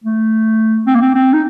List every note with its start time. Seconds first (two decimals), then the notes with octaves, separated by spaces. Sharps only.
0.04 A3
0.87 C4
0.95 A#3
1.01 C4
1.15 C4
1.33 D#4